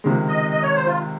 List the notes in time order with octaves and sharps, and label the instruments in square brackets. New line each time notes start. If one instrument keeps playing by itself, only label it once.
[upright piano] C#2 C3 D#3 G#3
[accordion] D#5
D#5
C#5
C5
F4